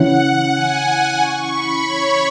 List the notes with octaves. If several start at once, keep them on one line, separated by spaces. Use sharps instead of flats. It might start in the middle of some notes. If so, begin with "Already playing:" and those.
Already playing: C#3 E3 C#4 E4 F#5
G#5
C#6
B5
C#5